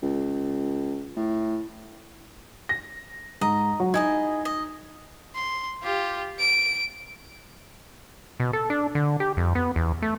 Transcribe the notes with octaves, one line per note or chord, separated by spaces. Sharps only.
C#2
A2
A#6
G#2 D#5 A#5
F#3
D#4 E4 G#4 D#5 G#6
D#5
C6
F4 G4
D7
B2
A4
D4
D3
G4
F2
B3
E2
A3